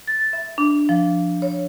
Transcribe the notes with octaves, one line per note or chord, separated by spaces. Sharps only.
A6
E5
D4
F3
C#5